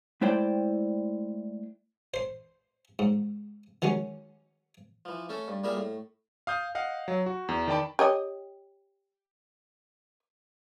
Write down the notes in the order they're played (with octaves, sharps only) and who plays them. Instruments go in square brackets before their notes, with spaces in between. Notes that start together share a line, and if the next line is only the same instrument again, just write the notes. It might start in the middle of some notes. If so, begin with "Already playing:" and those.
[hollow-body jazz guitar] G#3 A3 E4 C5 D5 G5
[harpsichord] C5 C6
G#2
D#3 F#3 G#3 C#4
E3 F3
A3 C#4 A4
G2
A#2 G3 G#4 A#4 E5
A2
[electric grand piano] F5 D#6 G6
D#5 F5 F#5
F#3
F#4
E2
D#3 D5 G5 A5 B5
[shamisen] G4 C#5 D#5